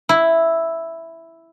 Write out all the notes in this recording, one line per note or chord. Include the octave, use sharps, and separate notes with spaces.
E4